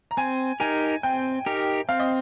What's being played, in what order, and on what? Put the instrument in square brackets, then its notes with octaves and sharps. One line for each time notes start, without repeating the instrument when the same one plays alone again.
[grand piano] A#5
[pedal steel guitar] C4 [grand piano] G#5
[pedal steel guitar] D#4 G4 A#4 [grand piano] G#5
[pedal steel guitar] C4 [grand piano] G5
[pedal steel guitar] D#4 G4 A#4
[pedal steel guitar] C4 [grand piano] F5
[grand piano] D#5